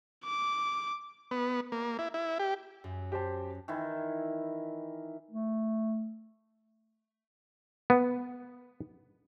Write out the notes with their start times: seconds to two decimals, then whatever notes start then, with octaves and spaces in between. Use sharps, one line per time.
0.24 D6
1.31 B3
1.72 A#3
1.99 E4
2.14 E4
2.39 G4
2.84 F#2
3.12 G4 C5 A5
3.68 D#3 E3 E4
5.31 A3
7.90 B3